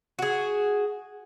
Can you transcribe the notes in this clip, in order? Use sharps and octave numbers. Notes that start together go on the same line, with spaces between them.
F#4 G#4